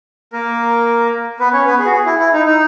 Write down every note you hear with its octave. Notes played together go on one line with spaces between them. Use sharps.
A#3 A#4
B3 B4
C#4 C#5
B3 B4
G#4
F#4
G#4
E4
E4
D#4
D#4